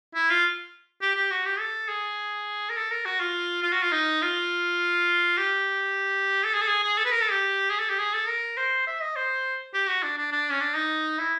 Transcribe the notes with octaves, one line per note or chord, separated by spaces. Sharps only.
E4
F4
G4
G4
F#4
G4
A4
G#4
A#4
A4
A#4
F#4
F4
F4
F#4
F4
D#4
F4
G4
A4
G#4
A4
G#4
G#4
A4
B4
A#4
A4
G4
G#4
A4
G4
G#4
A4
A#4
C5
E5
D#5
C5
G4
F#4
D4
D4
D4
C#4
D4
D#4
E4